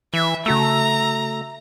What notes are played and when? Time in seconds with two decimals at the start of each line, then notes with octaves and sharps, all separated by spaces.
0.14 E3 E5
0.46 C#3 A3 F#4 A#5 E6